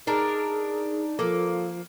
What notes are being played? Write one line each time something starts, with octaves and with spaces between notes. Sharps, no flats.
D4 D#4 G#4 A#4
F3 A#3 A4